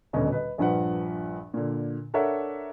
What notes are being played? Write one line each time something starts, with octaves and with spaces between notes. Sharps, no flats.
D#1 D2 B2 D3 C#4 D#5
B4 D#5
A#1 G2 F3 B4 F#5
A#2 D3
D4 A4 A#4 C#5 E5 F#5